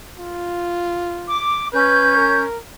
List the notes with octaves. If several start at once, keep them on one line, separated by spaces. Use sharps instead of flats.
F4
D6
C#4 B4 G6
A#4